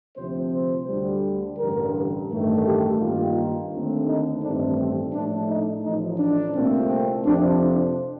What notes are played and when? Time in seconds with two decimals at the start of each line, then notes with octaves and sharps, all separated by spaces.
0.17 D2 C3 F3 C4 C5
0.53 C5
0.88 D2 D3 G3
1.58 A1 G2 D3 A#4
2.30 A1 G2 D#3 A3
2.65 G4
3.00 G2 D#3 A#3 F4
3.71 D#2 D3 A3 C4
4.06 D#4
4.42 A1 G2 D#3 A3 C4 D4
4.77 C4
5.12 A#1 A2 A3 D4
5.48 D#4
5.84 A1 A2 F3 D#4
6.19 D4
6.54 C2 A#2 A3 C4
7.25 F2 C3 F3 C4 D4
7.61 D4